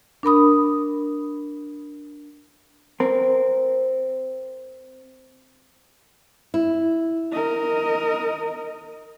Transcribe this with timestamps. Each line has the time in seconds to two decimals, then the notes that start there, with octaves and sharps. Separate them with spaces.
0.23 D4 A#4 B5 D#6
3.00 C4 A#4
6.54 E4
7.32 A#4 D#5